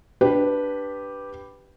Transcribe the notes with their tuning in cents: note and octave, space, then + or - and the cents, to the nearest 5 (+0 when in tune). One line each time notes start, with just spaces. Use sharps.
D4 +0 G4 +0 B4 +0